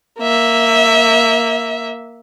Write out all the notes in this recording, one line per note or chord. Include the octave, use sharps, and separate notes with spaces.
A#3 E5